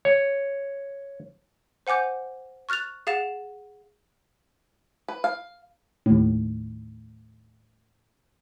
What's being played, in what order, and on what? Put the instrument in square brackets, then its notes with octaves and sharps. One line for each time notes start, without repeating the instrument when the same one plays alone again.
[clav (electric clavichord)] C#5
[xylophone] C5 F#5 G#5 D6 G6
C#6 F6 F#6 A6 F7
G#4 F5 F#5 A6 E7
[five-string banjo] B4
F5
[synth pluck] D#2 A2